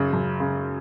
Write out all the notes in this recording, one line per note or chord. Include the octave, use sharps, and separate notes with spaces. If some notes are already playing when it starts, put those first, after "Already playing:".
Already playing: F#2 C#3
F#2
C#3